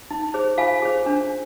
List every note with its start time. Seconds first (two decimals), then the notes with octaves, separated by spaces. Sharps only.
0.11 D#4
0.34 G#4 C5
0.58 F4 F5 G#5
0.82 G#4 C5
1.06 D4